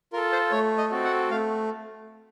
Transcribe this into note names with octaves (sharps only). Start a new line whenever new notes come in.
F4 A4 A#4
C5
A3 C#5
D#5
C4 F#4 A4
F#5
A3 F5